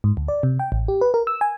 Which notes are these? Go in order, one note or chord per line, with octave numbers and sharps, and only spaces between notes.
G#2
D2
D5
C3
G5
A1
G4
B4
A#4
E6
G#5